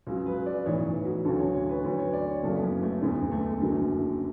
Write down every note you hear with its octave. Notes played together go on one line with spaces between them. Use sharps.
C#2 C#3 F#3
B4
D5
B1 A2 E3 C#5
F#4
D2 C#3 F#3 A4
C#5
C#5
B4
D2 D3 F#3 B4
C#5
D5
C#5
F#1 F#2 C#3 F#3 A4
B3
C#4
A3
E1 D2 D3 B3
A3
F#1 F#2 D3 F#3